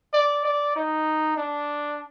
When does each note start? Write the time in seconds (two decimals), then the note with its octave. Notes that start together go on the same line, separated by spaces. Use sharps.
0.13 D5
0.45 D5
0.76 D#4
1.37 D4